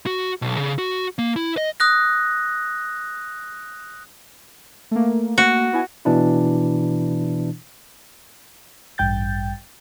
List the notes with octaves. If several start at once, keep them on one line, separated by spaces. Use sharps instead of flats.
F#4
B1
C#3
F#4
A#3
E4
D#5
D#6 F#6 A#6
A3 A#3
F#4
B3 E4 G#5
B2 E3 D4 E4
A1 G2 G5 G6 A6